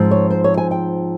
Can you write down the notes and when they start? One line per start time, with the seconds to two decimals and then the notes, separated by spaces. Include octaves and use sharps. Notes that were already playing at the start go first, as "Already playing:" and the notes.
Already playing: G#2 F3 C4
0.11 C#5
0.30 C5
0.44 C#5
0.57 G#5
0.71 G5